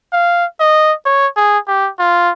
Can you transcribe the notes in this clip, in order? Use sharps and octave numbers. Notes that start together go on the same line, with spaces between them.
F5
D#5
C#5
G#4
G4
F4